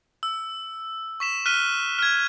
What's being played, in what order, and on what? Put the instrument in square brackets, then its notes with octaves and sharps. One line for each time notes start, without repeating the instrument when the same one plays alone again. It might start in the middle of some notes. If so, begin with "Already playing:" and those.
[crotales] E6
C#6 B6 E7
F6 F#6 B6 D#7 G7
F6 G#6